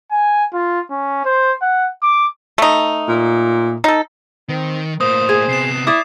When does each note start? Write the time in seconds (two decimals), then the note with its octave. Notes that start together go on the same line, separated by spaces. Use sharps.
0.11 G#5
0.53 F4
0.90 C#4
1.25 C5
1.62 F#5
2.02 D6
2.58 A3 D#4
3.08 A#2
3.84 D#4 A4
4.49 D#3 C4
5.01 A2 A#3 C5 D#6
5.29 G#4
5.49 C3 B3 C7 E7
5.87 E4 D5 D6 D#6